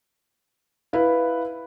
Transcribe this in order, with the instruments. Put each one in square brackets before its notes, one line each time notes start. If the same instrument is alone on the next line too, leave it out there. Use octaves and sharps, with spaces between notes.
[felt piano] E4 B4 F5